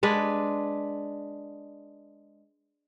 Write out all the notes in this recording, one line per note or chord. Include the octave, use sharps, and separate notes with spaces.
G#3 D4 B4